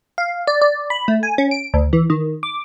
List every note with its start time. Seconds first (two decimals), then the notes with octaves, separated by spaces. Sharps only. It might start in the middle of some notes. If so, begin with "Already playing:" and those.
0.18 F5
0.47 D5
0.62 D5
0.90 B5
1.08 A3
1.23 G#5
1.38 C#4
1.51 D7
1.74 D2
1.93 E3
2.10 D#3
2.43 D6